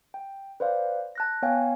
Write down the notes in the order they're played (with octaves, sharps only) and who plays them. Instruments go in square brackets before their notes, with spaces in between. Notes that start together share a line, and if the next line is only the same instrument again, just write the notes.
[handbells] G5
B4 C5 D5 F5
A5 F#6 A#6
B3 C#5 F5 G5 G#5